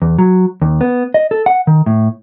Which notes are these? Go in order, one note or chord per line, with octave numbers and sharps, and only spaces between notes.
E2
F#3
D#2
B3
D#5
A4
F#5
D#3
A2